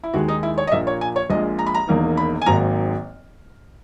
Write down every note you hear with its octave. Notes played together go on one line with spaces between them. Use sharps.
E4
D#2 D#3 G#3 F#4
D#4
E4
C#5
D#5
A#1 A#2 A#3 E5
C#5
G#5
C#5
A#1 A#2 G#3 D#5
A#5
B5
A#5
E1 E2 D#3 A#3 D#4
B5
G#5
G#1 G#2 D#3 F#3 A#3 A#5